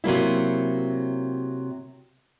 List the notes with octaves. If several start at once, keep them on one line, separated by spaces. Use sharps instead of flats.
C3 F#3 A#3 E4